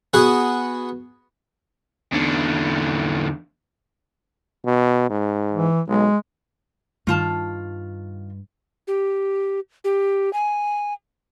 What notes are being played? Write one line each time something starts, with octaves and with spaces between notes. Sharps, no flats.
B3 F#4 G#4 F#5 G#5
E2 D3
B2
G#2
E3
B1 G#3
G2 D#3 F4 A5
G4
G4
G#5